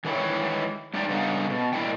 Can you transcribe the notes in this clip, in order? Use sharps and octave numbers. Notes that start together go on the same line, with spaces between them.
D#3 E3 G#3 E4 C#5 G5
A3 D4 D#4 D5 G5
G2 C#3 B3 D#4
B2
A#2 C4 E4 D#5 G5